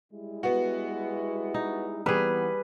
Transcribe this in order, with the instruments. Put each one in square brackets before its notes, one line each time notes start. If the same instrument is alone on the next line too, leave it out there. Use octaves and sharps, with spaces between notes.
[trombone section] G3 G#3 E4
[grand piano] B3 F#4
[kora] D#4
[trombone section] E3 B3 [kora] G3 G#4 [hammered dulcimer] B4